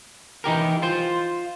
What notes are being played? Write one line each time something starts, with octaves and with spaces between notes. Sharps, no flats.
E3 D#4 G4 A#4
F4 C5